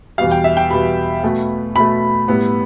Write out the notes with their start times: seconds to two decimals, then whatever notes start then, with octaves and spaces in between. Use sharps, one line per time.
0.18 E2 B2 G3 F5
0.31 G5
0.44 E5
0.57 G5
0.70 E2 B2 G3 B5
1.23 B2 A3
1.75 B2 A3 B5
2.28 A2 G3 B3